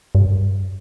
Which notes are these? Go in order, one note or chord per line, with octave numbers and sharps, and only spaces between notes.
G2